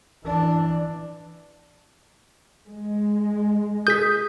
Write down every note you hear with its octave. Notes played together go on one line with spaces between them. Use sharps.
E3 D4
G#3
G#4 D#6 G6 B6